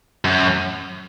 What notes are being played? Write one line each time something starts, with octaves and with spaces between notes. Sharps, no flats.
F#2